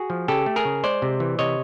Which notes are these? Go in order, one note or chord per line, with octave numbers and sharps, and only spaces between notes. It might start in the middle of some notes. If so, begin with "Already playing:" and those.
Already playing: F#4 G#4
F3
C#3 G4 A4
A3
G#4 A#4
C#3
G#3 C5 D5
C3
E3
C3 C#5 D#5